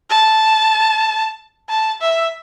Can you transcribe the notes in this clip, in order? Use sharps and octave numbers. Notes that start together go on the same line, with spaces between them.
A5
A5
E5